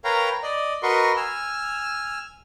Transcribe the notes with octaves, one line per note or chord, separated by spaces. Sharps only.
A#4 B4 C#5 F5 G5 A#5
D5 D#5
F#4 A#4 B4 D#5 C6 C#6
G#5 E6 F6